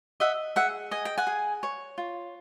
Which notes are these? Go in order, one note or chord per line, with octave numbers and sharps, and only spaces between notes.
D#5 E5 F#5
G#4 E5 F#5
D#5 G#5
G5
F#5 G#5
G#4
C#5
F4